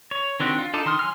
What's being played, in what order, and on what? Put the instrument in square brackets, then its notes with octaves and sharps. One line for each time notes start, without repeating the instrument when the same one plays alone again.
[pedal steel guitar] C#5
D#3 C4 D4 F#4 G4
F4
D4 D#4 A4 A5 D6
D#3 C6 D#6 F6
F#3 G#5 C6 E6 F6